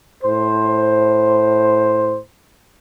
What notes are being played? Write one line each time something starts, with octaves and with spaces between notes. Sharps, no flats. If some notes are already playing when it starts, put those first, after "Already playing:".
A2 C5